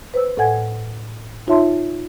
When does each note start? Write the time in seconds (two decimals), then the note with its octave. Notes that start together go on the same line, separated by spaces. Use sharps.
0.14 B4 C5 E6
0.37 A2 A4 D5 F#5 G#5 G#6
1.47 D#4 F4 C#5 E5 A5 C6